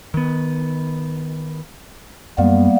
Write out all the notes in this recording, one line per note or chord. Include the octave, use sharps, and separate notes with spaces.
D#3 B3
F#2 G3 A#3 B3